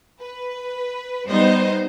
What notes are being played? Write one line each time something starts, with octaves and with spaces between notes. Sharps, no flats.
B4
G3 B3 D#4 C5 D#5